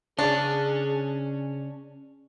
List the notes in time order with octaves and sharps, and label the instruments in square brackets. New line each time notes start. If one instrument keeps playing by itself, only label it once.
[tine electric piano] C#3 [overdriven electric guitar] C#4 [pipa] D4 [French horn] G#4